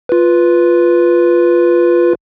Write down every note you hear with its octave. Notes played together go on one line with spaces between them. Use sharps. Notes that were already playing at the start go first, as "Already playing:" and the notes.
F4 B4